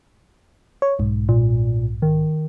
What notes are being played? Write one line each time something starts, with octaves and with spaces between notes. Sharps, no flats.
C#5
B1 G#2
A#2
D#3